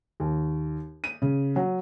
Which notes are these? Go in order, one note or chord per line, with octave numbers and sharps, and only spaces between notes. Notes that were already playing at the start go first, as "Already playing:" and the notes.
D#2
D#7
C#3
F#3